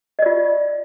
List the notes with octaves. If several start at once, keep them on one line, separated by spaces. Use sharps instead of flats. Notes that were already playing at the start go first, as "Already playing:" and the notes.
F4 D5 D#5